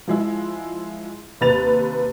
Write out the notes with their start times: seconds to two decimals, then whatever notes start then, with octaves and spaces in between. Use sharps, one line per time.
0.08 F3 G#3 E4
1.41 D#2 C3 B4 A6 F7